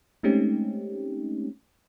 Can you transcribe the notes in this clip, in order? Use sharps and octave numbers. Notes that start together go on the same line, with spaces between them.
G#3 A3 C4 C#4 D#4 G4